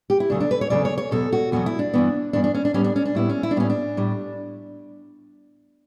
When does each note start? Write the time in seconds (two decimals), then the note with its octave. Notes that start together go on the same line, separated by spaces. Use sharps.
0.10 G4
0.20 E4
0.30 E2 C#3 F#3 A3 D4
0.40 D4
0.51 B4
0.61 C#5
0.70 E2 C#3 F#3 A3 D5
0.85 C#5
0.98 C#5
1.11 E2 B2 F#3 A4
1.32 F#4
1.52 E2 B2 F#3 F#4
1.66 E4
1.79 D4
1.94 G2 E3 B3
2.33 G2 E3 B3 D4
2.44 D4
2.54 C#4
2.65 D4
2.74 A2 G3 B3 C#4
2.84 D4
2.96 C#4
3.05 D4
3.15 A2 G3 B3 E4
3.29 C#4
3.43 E4
3.51 D4
3.56 A2 G3 B3 C#4
3.70 D4
3.97 A2 G3